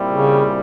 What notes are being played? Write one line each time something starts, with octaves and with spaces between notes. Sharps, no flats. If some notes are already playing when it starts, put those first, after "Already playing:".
Already playing: A#2 G3 C4 E4
C#3